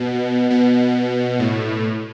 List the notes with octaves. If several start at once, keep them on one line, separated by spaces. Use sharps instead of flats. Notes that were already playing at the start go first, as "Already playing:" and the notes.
Already playing: B2
B2
A2